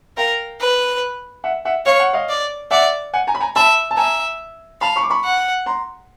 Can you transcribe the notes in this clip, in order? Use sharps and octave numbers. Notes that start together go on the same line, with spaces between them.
A#4 F5 G5
B4
E5 F#5
E5 F#5
C#5 F5
F#5
D#5 F5
D5
D5 E5 F#5
F#5 G#5
G#5 A#5
B5
G#5 A#5
E5 A5 B5
A5
E5 G#5 A#5
F5 A5 B5
B5 C#6
D6
B5 C#6
F#5
A#5 C6